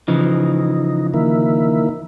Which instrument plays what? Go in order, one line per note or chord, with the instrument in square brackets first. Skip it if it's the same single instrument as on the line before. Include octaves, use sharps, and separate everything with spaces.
[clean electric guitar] C#3 E3 F3 [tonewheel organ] D#4
[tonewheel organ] D#3 A#3 E4